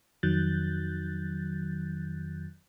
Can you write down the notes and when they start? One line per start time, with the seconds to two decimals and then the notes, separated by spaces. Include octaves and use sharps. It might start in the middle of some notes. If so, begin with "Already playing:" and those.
0.23 F2 D#3 F#3 F#6 G6 A6